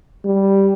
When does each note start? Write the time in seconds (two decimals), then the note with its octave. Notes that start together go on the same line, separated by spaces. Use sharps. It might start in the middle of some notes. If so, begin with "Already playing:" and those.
0.25 G3